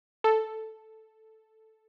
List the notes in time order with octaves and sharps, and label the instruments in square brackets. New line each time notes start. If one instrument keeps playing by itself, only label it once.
[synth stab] A4